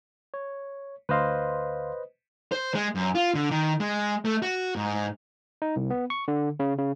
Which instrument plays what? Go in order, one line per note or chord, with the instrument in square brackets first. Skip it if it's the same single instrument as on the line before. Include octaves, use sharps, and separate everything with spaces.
[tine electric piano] C#5
[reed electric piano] D2 F5 C6 [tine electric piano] B4 C5 D#5
[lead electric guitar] C5
G#3
F#2
F4
D3
D#3
G#3
A3
F#4
G#2
[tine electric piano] D#4
C2
B3
C#6
D3
C#3
C#3